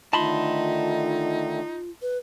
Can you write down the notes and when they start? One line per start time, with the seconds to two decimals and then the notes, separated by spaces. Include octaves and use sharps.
0.13 D3 D#3 A3 D#4 F4 A5 B5 C6
2.02 B4